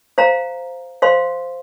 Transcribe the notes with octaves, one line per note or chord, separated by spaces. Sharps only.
C5 F5 A#5
C5 F5 C6